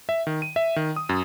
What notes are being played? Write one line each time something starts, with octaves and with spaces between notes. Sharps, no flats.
E5
D#3
D#7
E5
D#3
D#6
F#2